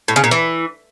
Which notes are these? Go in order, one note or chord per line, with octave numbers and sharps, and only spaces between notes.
A2
C#3
A#2
E3